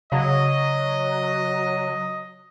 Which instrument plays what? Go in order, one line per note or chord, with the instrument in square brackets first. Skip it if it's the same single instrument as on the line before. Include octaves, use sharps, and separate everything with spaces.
[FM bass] C#3 [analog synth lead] F#3 [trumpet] D#5